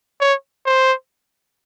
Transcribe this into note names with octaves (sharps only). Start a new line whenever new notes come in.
C#5
C5